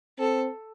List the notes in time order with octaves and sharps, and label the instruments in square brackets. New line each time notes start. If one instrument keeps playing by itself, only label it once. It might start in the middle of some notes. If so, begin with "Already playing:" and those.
[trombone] C4 [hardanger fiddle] A4